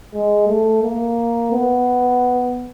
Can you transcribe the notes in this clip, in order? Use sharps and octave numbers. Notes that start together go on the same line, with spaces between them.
G#3
A3
A#3
B3